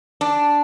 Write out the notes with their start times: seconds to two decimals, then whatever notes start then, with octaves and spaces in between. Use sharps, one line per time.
0.21 D4